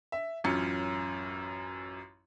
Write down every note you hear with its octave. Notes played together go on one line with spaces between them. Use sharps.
E5
A1 F#2 C#4 F4 C#7